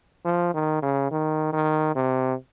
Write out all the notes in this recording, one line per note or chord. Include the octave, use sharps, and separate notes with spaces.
F3
D#3
C#3
D#3
D#3
C3